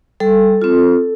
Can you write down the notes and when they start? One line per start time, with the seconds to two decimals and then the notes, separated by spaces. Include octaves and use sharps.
0.20 G3 A4
0.62 C4 F4